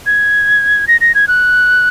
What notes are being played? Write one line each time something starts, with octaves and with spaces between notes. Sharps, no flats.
G#6
A#6
A#6
G#6
F#6